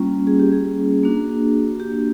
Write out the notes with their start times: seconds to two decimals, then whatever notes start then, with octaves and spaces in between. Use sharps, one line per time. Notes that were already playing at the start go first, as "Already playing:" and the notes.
Already playing: G3 A#3 C#4 F4
0.27 G#4
0.40 G4
0.52 G#4
1.03 A#3 D4 F#4
1.80 G4